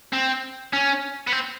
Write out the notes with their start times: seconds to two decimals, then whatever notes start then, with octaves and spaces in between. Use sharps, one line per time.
0.13 C4
0.73 C#4
1.27 B3
1.32 C4